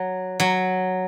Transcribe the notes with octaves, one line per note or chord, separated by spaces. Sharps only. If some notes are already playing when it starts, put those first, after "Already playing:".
Already playing: F#3
F#3